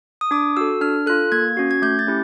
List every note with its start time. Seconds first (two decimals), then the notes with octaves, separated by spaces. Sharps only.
0.21 D#6
0.31 D4 D6
0.57 F#4 A4 E6
0.81 D4 F6
1.06 F4 A4 F#6
1.32 A#3 G#6
1.57 C#4 F#4
1.71 G#6
1.82 A3 G6
1.99 A6
2.07 C#4 E4 G4